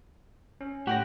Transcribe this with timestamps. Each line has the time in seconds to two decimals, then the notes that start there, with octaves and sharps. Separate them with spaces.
0.61 C#4
0.87 A2 G4 F#5 G5 A#6